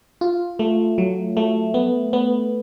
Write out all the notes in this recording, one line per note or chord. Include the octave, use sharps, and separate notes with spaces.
F4
A3
F#3
A3
B3
B3